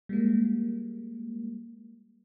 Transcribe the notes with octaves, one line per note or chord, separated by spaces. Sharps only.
G3 G#3 A#3